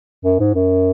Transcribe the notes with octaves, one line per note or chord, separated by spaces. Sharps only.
F#2
G#2
F#2